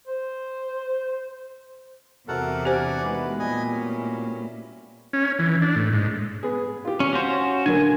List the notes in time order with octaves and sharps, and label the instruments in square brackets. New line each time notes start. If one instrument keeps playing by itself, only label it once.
[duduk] C5
[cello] E2 C3 [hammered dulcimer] F#4 C5 E5 [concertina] A4 A#4 F#5
[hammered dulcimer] D4 A#5 [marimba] G4 C5 [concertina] D5 F#5 G#5
[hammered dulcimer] D#3 A3 B3 [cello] G#3 [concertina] B4
[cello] A#2 [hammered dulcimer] G3 E4 F4 [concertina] D#5 G#5 D#6
[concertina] C#4
[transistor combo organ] C#4
E3
D4
A2
G#2
[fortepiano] B3 G#4
F4 G4
[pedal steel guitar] C#4
C#4 F#4 C5
[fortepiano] D3 F#3 A#3 [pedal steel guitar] G#5